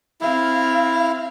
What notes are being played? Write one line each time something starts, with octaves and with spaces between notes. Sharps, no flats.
C4 E4 F5